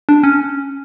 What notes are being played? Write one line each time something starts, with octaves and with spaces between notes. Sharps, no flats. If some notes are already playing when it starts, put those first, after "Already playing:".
D4
C#4